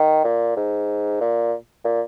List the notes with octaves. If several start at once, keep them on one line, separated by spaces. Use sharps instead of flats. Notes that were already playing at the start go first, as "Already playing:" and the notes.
Already playing: D#3
A#2
G#2
A#2
A#2